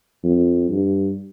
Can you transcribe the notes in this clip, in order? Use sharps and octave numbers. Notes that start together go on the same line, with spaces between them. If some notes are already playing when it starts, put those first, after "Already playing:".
F2
G2